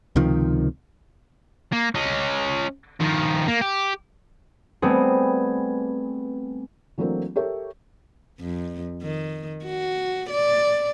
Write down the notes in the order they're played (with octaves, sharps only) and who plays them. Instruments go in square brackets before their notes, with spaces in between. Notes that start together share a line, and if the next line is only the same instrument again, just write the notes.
[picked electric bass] C#2 C3 D#3 F3
[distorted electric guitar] A#3
C#4 D#5
D#3 F3
A#3
G4
[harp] G3 A3 B3 C4 G#4
[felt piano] E3 F#3 A3 A#3 C4 D4
G4 A4 A#4 C#5 E5
[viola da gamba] F2
D#3
F#4
D5